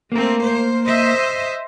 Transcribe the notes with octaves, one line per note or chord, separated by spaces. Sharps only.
A3 A#3 C4 A#4
C5
C5 D#5 E5